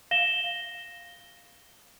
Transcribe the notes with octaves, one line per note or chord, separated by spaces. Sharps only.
F5 A#6 E7 G7